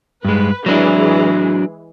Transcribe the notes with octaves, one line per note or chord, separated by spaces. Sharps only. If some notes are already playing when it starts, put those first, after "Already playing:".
G2 G#3 B4
E3 F#3 G#3 D4 G#4